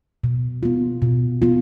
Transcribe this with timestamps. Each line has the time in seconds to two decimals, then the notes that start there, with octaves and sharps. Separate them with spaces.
0.24 B2
0.63 B3 F4
1.02 B2
1.42 B3 F4